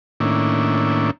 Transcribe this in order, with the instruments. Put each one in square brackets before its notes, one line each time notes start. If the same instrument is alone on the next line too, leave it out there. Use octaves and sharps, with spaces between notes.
[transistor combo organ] A2 D#3 A#3 C#4 D4 E4